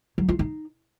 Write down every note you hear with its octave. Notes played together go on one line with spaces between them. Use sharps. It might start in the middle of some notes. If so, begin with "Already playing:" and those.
F#3
F4
D#4